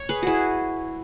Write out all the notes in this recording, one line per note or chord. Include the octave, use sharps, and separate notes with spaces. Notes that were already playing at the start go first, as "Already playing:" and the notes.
Already playing: C#5
G#4 B4
E4 F#4 G#4